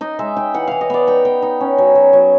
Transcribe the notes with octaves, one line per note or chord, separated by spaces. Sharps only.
D#4 D#5
G#3 E5
D#4 G5
E3 F#5
E3 F5
D#5
B3 D5
D#4 G5
B3 G5
D#4
C#4
F#3
F#3
F#3